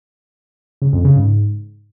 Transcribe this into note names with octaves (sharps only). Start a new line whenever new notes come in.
C#3
F2
C#3
G#2